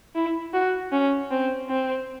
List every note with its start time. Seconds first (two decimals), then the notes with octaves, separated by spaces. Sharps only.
0.15 E4
0.53 F#4
0.93 C#4
1.31 C4
1.69 C4